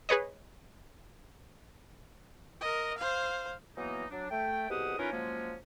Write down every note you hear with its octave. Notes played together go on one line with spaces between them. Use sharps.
G#4 B4 C#5 D#5
A#4 D#5
C5 F5
E3 F#3 A#3 B3 D#4
F#3 D4
A3 G5
C2 B2 G4 G#4 F#5 D#6
E3 C#4 D#4 F4 A#4 B4
F3 F#3 G#3 A#3 C#4